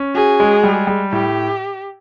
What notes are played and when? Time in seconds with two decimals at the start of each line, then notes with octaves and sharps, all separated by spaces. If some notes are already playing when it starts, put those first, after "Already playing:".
Already playing: C#4
0.15 F#4 G#4
0.40 G#3
0.63 G3
0.87 G3
1.12 A2 G4